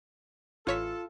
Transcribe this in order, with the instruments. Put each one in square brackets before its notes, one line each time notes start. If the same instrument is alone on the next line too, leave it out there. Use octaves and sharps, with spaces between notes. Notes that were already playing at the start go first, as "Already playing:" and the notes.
[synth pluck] A1 C#5 B6 [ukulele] F4 [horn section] A4